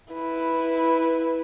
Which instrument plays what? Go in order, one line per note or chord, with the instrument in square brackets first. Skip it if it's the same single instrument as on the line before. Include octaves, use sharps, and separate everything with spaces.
[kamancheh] E4 B4